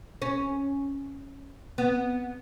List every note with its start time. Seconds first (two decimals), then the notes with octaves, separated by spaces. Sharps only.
0.22 C#4
1.78 B3